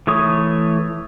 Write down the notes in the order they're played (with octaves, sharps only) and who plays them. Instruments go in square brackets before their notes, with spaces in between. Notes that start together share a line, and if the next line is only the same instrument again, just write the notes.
[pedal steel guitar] E3 A3 C#5 D#6